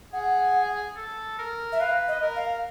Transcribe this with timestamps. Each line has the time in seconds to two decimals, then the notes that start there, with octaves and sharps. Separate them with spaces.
0.13 G#4 F#5
0.96 A4
1.39 A#4
1.72 E5
1.80 B4 F5
2.08 D#5
2.22 A#4
2.36 F5